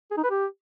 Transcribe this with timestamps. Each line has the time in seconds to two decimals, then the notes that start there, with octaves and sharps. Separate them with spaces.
0.11 G#4
0.17 D#4
0.24 B4
0.30 G4